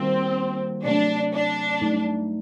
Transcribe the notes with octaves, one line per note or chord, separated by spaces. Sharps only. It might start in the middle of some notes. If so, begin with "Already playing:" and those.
Already playing: D#3 G3 A#3 C4 F#4
C3 F#3 A3 D4
D4
G2 F#3 A3 D#4